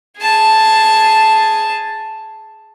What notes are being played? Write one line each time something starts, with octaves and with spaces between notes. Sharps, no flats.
G#4 A5